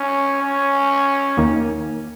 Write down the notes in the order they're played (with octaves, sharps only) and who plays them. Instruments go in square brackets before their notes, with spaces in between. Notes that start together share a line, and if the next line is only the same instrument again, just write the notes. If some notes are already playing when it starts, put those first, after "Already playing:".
Already playing: [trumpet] C#4
C#4
[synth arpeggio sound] D#2 D#3 A#3 D#4